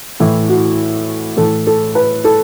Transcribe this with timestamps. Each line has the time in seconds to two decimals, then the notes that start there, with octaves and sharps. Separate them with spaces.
0.20 A2 E3 E4
0.49 F#4
1.36 A2 E3 A4
1.67 A4
1.95 B4
2.24 A4